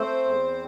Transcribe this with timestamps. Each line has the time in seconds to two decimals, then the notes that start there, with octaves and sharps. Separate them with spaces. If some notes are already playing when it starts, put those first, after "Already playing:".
Already playing: A3 C4 C5
0.25 E2